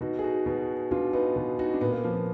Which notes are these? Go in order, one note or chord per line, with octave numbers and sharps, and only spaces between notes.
B2 D#4 F#4
G#4
D#4 F#4
B2
B2 D4 F4
B3 D#4
B2
D#4 F#4
D4
A#2 B3
A#3
F3 A#3
A#3